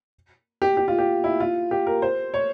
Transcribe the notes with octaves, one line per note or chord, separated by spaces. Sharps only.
G4
G4
F4
G4
E4
F4
G4
A#4
C5
C#5